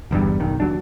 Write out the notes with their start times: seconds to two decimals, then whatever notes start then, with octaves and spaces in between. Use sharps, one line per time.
0.11 G1 E2 G2 G3
0.40 F#1 B1 D#3
0.60 D#2 F#3 D4